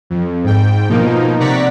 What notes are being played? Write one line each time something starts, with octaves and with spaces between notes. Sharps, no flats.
F2
G#2 G5
B2 F3 A#3 D#4
C3 D5 F#5 A#5 C#6 B6